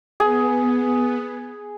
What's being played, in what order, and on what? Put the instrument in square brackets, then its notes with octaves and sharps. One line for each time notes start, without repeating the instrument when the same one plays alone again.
[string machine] B3 [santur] G#4